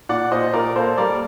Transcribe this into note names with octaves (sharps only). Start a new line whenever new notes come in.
A#2 D5 F#5
A#2 C5 D#5
A#2 A#4 D5
A#3 A4 C5
G3 A#4 D5